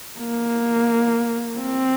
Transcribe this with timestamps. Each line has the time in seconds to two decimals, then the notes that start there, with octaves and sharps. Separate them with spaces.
0.19 A#3
1.59 C4